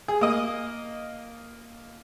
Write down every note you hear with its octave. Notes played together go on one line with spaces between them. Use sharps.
G#4
A#3 D#5